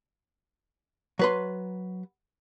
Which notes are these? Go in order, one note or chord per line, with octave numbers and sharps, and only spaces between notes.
F#3 B4 C6